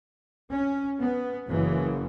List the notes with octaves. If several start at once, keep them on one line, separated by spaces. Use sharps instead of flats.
C#4
B3
F#1 F#2 C#3 E3